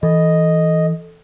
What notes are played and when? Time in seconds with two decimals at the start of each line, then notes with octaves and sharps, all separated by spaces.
0.03 E3 A4 D#5